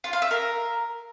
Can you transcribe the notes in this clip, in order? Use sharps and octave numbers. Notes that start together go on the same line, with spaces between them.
F4
F5
E5
A#4